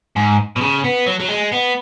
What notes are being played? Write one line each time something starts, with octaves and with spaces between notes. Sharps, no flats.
G#2
B2
C#3
B3
F#3
F#3
G#3
B3